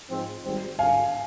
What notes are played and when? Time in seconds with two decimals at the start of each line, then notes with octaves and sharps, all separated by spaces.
0.10 G#2 F3 G#3 C4
0.44 G#1 G#2 D#3 G3 C4
0.78 G#1 G2 D3 F5 G#5